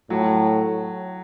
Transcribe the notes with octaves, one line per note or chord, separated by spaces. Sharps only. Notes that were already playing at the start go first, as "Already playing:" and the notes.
A2 F#3